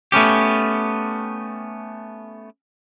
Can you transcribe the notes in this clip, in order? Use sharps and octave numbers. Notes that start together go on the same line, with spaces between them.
A3 B3 C#4 G4